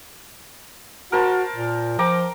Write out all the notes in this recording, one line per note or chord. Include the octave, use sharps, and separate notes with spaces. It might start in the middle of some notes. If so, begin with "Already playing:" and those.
F#4 A#4 C5 A5
A#2
F3 G5 A#5 D6